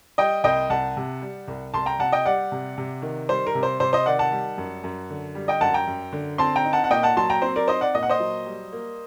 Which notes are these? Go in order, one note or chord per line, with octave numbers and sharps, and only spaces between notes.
G3 D#5 G5
C2 D#5 G5
C2 F#5 A5
C3
G3
C2
C2 A5 C6
G5 A#5
C3 F#5 A5
D#5 G5
G3 D5 F#5
C3
C3
D#3
G3 C5
A#4
C3
C5
C3 C5
C5 D#5
D#3 D5 F#5
F#5 A5
G3
F#2
F#2
D3
G3
D#5 G5
F#2 F#5 A5
G5 A#5
F#2
D3
C4 A5 C6
G5 A#5
D#4
F#5 A5
F#5
A#2 D#5 G5
F#5 A5
F#3 A5 C6
G5 A#5
C4 C5
A#4 D5
D#4 C5 D#5
D5 F#5
A#2 D#5
F#5
C5 D#5
F#3
G3
A#3